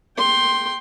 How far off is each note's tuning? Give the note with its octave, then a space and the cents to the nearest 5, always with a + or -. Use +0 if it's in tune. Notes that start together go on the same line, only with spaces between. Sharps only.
G5 +0 C6 +10